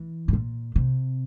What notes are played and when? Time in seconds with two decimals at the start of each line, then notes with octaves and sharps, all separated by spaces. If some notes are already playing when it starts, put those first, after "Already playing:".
Already playing: E3
0.28 G#2
0.33 A#2
0.76 C3